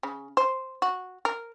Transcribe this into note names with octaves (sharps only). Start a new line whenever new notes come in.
C#3
C5
F#4
A#4